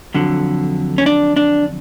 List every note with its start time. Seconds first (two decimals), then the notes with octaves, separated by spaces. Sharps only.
0.14 F2 D3 F#3
0.98 C#4
1.06 D4
1.36 D4